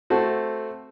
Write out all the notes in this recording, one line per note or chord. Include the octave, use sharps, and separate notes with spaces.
A3 C4 F#4